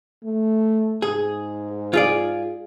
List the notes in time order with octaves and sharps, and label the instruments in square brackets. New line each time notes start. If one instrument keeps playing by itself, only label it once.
[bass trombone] A3
[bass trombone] G#2 [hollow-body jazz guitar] G#4
[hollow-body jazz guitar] F4 G#4 D5